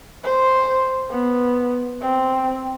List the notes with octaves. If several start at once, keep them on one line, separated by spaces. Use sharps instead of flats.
C5
B3
C4